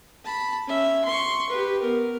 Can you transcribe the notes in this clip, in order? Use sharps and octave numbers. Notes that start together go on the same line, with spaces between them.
A5 B5
C#4 E5
C6 C#6
G4 B4
B3 A#4